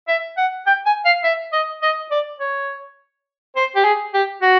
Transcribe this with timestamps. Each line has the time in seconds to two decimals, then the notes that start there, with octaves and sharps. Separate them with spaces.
0.08 E5
0.37 F#5
0.67 G5
0.86 G#5
1.05 F5
1.24 E5
1.53 D#5
1.82 D#5
2.11 D5
2.40 C#5
3.56 C5
3.75 G4
3.84 G#4
4.14 G4
4.42 F#4